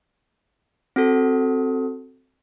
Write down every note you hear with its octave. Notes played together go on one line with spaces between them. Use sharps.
C4 F#4 A4